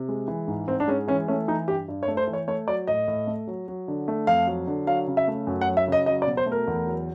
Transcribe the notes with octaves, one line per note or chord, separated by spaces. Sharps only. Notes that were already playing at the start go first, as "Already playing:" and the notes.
Already playing: C3
G#3
E3
G#2
G#2 C4
D4
G#3 C#4
E3 C#4
A3 C#4
E3 D#4
G2 G4
G2
C#5
A3
C5
E3
C#5
A3 C#5
F#3 D5
A2 D#5
A2
A3
F#3
F#3
D3
A3
F2 F5
F#3
D3
F#3 F5
C#3
E5
A3
F#2
F#5
F#3
E5
C#3 D#5
F#3 D#5
D5
B2
C5
A3
A#4
E2
F#3